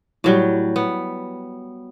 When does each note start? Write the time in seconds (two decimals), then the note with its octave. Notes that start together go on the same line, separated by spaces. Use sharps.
0.24 A2 F#3 G3
0.76 B3